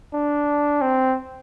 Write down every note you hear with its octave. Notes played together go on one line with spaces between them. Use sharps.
D4
C4